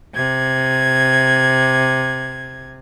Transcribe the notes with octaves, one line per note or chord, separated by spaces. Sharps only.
C3 G#6